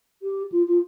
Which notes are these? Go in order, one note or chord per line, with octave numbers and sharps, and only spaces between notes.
G4
F4
F4